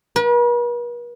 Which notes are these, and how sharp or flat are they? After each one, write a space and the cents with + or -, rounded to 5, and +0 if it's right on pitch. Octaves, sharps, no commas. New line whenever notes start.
B4 -45